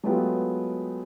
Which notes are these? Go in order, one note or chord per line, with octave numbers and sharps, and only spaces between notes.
F#3 G#3 A3 B3 F4 G4